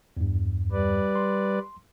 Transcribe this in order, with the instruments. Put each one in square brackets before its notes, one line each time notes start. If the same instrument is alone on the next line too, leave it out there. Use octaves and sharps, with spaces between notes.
[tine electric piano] E2 G2
[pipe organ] G3 B4 D5
[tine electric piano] C6